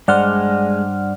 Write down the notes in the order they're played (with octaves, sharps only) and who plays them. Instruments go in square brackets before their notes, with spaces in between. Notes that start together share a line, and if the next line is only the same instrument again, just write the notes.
[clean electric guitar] G2 C5 [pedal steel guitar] G#3 [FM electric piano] D5 F#5 F6